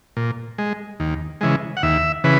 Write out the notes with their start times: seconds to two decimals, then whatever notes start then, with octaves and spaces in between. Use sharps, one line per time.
0.17 A#2
0.58 G#3
1.00 D#2
1.41 C#3 E3 G#3
1.77 F#5
1.83 D#2 E5
2.24 C#3 E3 B4